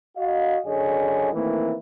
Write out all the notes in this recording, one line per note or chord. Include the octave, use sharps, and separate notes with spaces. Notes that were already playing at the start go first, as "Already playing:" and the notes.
F#4 D#5 F5
F#2 D3 G#4 C#5 D#5 G#5
D#3 E3 A3 A#3 C4 E4